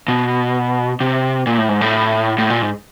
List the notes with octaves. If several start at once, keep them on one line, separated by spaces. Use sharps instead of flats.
B2
C3
A#2
A2
G#2
A2
A2
A#2
G#2